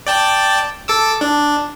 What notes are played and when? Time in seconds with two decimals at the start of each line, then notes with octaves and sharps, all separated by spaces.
0.07 D5 G5 A5
0.88 A4 D6 E6
1.21 D4